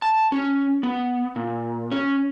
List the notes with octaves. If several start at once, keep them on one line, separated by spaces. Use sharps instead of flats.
A5
C#4
B3
A#2
C#4